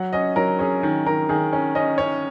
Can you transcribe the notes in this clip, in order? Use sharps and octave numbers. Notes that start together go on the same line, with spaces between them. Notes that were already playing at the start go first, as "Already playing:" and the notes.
Already playing: F#3 F#5
C#4 D#5
F#3 A#4
C#4 G#4
D#3
D#3 A#4
D#3 G#4
C#4
C#4 D#5
C#4 C#5